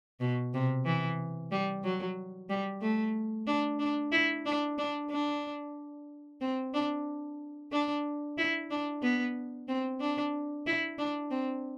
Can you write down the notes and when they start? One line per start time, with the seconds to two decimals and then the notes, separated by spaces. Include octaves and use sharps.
0.20 B2
0.54 C3
0.85 E3
1.52 G3
1.83 F#3
2.50 G3
2.82 A3
3.47 D4
3.79 D4
4.12 E4
4.46 D4
4.78 D4
5.11 D4
6.41 C4
6.74 D4
7.72 D4
8.38 E4
8.70 D4
9.02 B3
9.68 C4
10.01 D4
10.66 E4
10.98 D4
11.31 C4